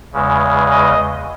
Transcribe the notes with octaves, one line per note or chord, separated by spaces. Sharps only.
E2 C#3 G#3
D#5